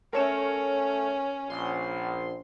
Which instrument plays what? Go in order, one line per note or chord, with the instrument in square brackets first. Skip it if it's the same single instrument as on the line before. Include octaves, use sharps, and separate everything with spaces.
[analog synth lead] A3 [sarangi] C#4 [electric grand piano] A#4 C#5 E7
[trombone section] A#1 [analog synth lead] C6